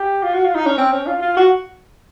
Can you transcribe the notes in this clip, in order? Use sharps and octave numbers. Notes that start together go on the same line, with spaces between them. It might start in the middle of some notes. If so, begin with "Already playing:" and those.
Already playing: G4
F4
F#4
F4
D#4
C#4
C4
C#4
F4
F4
F#4